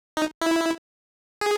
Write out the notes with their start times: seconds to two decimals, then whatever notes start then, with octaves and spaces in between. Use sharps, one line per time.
0.17 D#4
0.41 E4
1.41 G#4